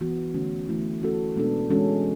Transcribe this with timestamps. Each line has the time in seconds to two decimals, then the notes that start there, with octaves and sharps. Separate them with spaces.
0.01 E3 B3 F#4
0.34 D3 A3 C#4 F#4
0.68 E3 A3 E4
1.02 A3 C#4 F#4 A4
1.36 B2 G#3 B3 D4 A4
1.70 E3 G#3 C#4 F#4 A4